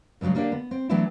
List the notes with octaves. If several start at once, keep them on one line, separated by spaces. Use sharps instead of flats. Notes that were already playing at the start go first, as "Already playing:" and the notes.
G2 C#3 E3 F#3 G#3
D3 A#3 D4 G4 D5
B3
C4
E3 F#3 A3 B3 D4 E4